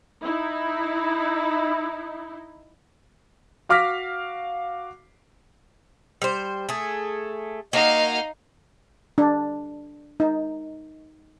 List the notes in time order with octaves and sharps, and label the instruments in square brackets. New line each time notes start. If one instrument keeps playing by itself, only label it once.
[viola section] D#4 E4
[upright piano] F#4 F5 D6 F6 A#6 B6
[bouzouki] G3 C5
A3 G#4
[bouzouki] A#3 F#4 [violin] D#4 F5 [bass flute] D#5
[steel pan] D4
D#4